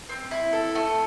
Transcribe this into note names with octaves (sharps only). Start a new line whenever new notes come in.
C4
E4
A4
A3